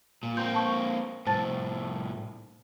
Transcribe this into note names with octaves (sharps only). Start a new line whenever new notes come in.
A#2
A#3 C4 C6 G6
A5 C#6
C2 A2 C5 A5 A6